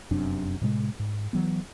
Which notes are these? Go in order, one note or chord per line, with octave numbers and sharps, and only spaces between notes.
F1 F#2 C3 D4
A2 C3 G#3
G#2
E3 F#3 B3